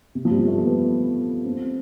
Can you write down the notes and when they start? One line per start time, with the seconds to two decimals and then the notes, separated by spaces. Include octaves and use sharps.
0.15 C3
0.25 F3
0.31 G3
0.47 A3
0.64 B3
1.45 C4